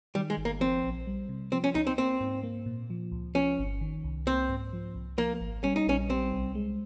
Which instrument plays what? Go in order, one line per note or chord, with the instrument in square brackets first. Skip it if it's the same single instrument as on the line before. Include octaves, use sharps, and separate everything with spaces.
[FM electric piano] D#3 [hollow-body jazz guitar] G3
[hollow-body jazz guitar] G#3
[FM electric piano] G1
[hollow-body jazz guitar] A#3
[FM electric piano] F3 [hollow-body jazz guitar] C4
[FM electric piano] A#1
G3
C3
[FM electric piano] F3 [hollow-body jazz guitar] C4
[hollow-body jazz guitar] C#4
[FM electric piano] C#2 [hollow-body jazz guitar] D#4
[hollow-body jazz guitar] C4
[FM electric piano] A#3 [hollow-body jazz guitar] C4
[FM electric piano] G#2
A#3
A#2
F3
C#2
[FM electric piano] F3 [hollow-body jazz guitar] C#4
[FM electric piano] G1
D#3
C2
[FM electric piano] A#3 [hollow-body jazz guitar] C4
[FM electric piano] G#2
F3
C2
[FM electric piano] F3 [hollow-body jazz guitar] A#3
[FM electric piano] G#1
[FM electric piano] G3 [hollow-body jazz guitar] C#4
[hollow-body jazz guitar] D#4
[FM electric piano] A#1 [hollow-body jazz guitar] C#4
[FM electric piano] G3 [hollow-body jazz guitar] C4
[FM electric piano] C2
G#3